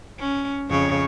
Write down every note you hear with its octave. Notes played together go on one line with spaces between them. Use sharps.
C#4
F2 C#3 C#5